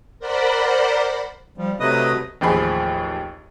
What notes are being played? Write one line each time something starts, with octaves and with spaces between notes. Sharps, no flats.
A#4 C5 D5 F#5 B5
F3 G3
C3 F#3 A3 B4 D#5 D#6
A1 D#2 F3 G#4 B5